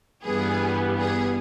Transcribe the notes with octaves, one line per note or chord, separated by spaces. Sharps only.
G2 E3 G3 B3 G#4
G#4